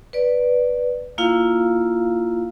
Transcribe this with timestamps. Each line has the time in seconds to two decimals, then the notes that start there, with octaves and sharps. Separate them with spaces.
0.13 B4 D5
1.18 A#3 E4 F4 F5